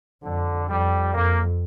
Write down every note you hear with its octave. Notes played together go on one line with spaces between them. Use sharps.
F2 D3
F2 G3
F2 A#3